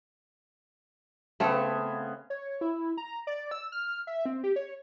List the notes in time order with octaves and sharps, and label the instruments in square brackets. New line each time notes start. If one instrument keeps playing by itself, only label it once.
[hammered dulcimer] C#3 B3 [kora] A3 C4 A4
[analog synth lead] C#5
E4
A#5
D5
E6
F6
E5
C4
G4
C#5